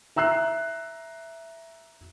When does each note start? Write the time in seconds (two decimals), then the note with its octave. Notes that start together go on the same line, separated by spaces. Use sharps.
0.16 E5 A#5 E6 F#6 C7